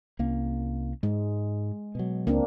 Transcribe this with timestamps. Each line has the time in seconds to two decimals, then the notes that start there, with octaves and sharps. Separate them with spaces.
0.19 C2 A#3 C#4
1.03 G#2 G#3
1.95 B2 F#3
2.27 C#2 A#3 C4 D4